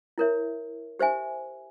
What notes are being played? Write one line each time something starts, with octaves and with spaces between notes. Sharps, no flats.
E4 A#4 C#5 E5
G4 C5 E5 G#5